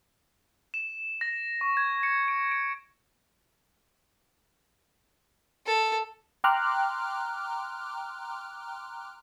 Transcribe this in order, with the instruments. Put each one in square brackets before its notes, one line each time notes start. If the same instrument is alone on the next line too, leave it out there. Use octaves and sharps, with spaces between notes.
[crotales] E7
A#6
C#6
G#6
C#7
D7
D7
[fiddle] A4
[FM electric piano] G5 A#5 C6 D6 F6 F#6